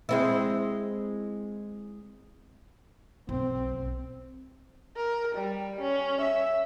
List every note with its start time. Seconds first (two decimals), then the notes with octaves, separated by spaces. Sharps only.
0.09 G#3 C4 E4
3.29 B1 C4
4.97 A#4
5.35 G3
5.81 C#4
6.21 E5